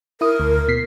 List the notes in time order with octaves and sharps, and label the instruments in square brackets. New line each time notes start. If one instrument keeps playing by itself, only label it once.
[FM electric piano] E4 D#6 [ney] A#4
[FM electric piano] D2
B2 B6 C7